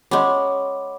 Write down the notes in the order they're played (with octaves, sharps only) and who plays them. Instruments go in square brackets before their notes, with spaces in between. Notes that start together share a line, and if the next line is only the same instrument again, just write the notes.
[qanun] G#3 C#4 [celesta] F#5 B5 D6